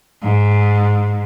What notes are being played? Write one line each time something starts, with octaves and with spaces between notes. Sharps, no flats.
G#2